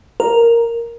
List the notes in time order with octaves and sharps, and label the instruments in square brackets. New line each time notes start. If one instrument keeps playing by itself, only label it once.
[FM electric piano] A#4